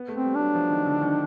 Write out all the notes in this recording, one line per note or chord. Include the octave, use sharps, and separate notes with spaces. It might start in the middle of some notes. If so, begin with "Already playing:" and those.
Already playing: B3
A3
C4
G3
F#3 D4
F3
D#3
D3
D#3